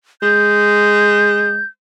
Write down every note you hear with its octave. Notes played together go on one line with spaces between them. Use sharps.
G#3 G6